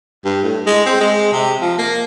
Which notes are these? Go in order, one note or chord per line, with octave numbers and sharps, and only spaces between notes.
G2
A2
G#3
C4
G#3
C3
F3
A#3